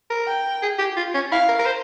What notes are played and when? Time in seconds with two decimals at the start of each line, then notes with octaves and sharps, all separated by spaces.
0.10 A#4
0.27 G5
0.62 G#4
0.79 G4
0.97 F4
1.14 C#4
1.32 E4 F5
1.49 A#4
1.59 A#4
1.66 C5